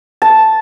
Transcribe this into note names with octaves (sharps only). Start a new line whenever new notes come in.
A5